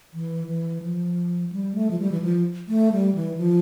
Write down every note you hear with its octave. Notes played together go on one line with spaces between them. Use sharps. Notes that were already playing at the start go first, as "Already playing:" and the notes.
E3
E3
F3
G3
A3
F3
G3
E3
F3
A3
G3
E3
F3